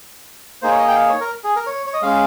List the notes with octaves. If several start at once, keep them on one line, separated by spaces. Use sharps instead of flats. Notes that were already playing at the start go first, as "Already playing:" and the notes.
A#3 D#4 G#4 C5
C#5
D#5
G5
F5
C#5
A#4
G#4
A#4
C#5
C#5
D#5
G#3 C#4 G#4 F5